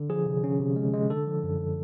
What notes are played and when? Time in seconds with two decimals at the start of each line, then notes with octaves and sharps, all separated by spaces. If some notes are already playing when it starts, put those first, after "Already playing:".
Already playing: D3
0.10 F3 G#4
0.26 C3
0.44 C#4
0.60 C3
0.76 G#3
0.94 G#3
1.10 D3 A4
1.27 F3
1.43 F#2